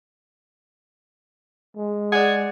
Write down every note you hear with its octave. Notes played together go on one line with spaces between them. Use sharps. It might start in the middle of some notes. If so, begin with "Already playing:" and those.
G#3
G#4 D5 F#5